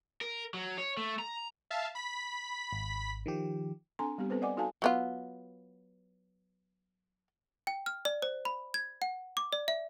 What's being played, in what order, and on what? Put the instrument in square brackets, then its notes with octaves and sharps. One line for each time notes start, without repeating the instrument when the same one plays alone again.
[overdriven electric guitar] A#4
F#3
C#5
A3
A#5
[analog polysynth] E5 F5 A5
B5 B6
[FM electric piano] G#1
D#3 F3 G4
[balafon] C4 D4 A4 G#5 A#5 C6
G3 B3 C4 G4
B3 C4 A4 B4 C5
D5 D#5 F#5 G#5 D6
D#4 F#4 A4 F5 G#5 A5
[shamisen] F#3 B3 F4
[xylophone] G5
F6
D5
C5
B5
G#6
F#5
D6
D5
E5